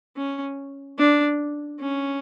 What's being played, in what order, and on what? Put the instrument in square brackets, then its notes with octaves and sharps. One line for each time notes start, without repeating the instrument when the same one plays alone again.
[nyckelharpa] C#4
D4
C#4